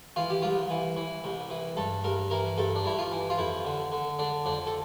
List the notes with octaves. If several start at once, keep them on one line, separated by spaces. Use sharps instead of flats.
E3 F4
G4
C2 F4
E3
E3
C2
E3
G2 A4
G2 A#4
E3 A#4
G2 A4
D4
G2 E4
F4
E3
F4
F2 E4
D3
D3
D3 D4
F2 D4
A4